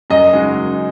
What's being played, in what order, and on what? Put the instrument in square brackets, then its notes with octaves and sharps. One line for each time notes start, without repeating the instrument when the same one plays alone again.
[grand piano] F#2 [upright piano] D#5
[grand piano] C#3 G#3 D#4 F#4
F#2